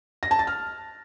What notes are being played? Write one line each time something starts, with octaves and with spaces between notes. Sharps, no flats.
A#6
A5
A6
F6